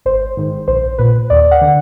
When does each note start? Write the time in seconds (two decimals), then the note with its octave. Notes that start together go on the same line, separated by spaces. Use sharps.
0.05 G#1 C5
0.37 G#2 D#3
0.68 A#1 C5
0.99 A#2 B4
1.30 D#2 D5
1.51 F#5
1.61 D3